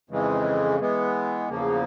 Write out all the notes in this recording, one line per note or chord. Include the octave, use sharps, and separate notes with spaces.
F2 C#3 E3 G#3
E3 G#3 B3
E2 C#3 F3 A#3